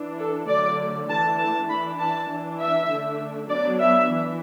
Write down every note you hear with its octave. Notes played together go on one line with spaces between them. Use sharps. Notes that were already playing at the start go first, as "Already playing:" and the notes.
Already playing: E3 D4
A4
D3 F#3 A3 D5
E3 A3 D4 A5
A5
E3 D4 B5
A5
E3 D4
E5
D3 A3 D4
F#3 B3 D4 D5
E5
E3